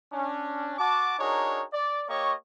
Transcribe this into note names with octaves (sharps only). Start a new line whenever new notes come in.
C#4 D4
F#4 A5 D6
D4 D#4 F#4 G#4 A#4 C#5
D5
A#3 G4 C#5 D#5 C#6